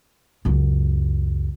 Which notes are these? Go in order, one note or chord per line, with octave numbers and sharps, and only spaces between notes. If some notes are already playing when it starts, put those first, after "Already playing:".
C#2 F#2